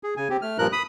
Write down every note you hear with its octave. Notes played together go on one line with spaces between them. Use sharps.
G#4
C#3 G#5
C4 G4
A3 F6
G2 A#2 F3 A#4 F#6
B5 D#6